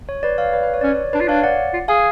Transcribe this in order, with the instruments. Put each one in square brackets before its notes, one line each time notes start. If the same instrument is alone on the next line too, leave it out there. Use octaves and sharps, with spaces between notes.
[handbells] C#5
B4 D5
C#5 F5
B4 D5
B4
C#5
[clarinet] C#4 [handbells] D5
[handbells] C#5
[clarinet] D4 [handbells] B4 D5
[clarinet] F4
[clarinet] D4 [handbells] C#5 F5
[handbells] D5 F#5
[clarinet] F4
[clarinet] G#4 [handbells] F5 G#5